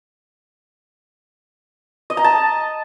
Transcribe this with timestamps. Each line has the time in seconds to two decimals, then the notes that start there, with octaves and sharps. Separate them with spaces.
2.10 D#5
2.17 A#5
2.24 A5